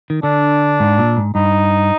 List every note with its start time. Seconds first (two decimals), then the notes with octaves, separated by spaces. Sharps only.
0.10 D#3
0.23 D3 D4
0.80 G#2
0.98 A#2
1.17 G#2
1.35 G2 D#4